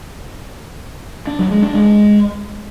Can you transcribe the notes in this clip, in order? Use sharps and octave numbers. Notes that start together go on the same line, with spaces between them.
D4
F#3
G#3
D4
G#3